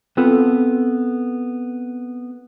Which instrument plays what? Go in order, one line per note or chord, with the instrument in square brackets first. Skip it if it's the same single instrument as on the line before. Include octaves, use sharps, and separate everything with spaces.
[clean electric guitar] B3 C4 F4 A4 B4